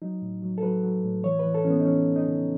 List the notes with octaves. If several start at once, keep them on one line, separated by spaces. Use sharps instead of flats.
F#3 D#4
A2
F#3
A4
F#3 B4
F#3
A2
E3 C#5
E3 B4
A4
E3 C#4
B3
D#4
E3 C#4
E3
D#4
C#3